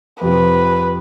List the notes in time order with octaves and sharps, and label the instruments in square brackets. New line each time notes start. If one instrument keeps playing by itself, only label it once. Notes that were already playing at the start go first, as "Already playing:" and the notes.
[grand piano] F2 C3 F3 [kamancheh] B4